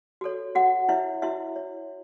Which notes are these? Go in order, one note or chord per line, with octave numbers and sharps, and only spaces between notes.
F#4 A4 C#5
F#4 F#5
E4 C#5 E5
E4 F#4 E5
C#5